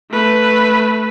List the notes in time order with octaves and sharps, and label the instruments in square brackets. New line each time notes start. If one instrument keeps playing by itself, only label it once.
[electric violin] A3 B4